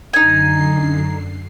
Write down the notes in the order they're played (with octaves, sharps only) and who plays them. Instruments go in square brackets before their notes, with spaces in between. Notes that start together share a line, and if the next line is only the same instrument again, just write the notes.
[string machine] F#2 D3 C7 [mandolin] D#4 G#5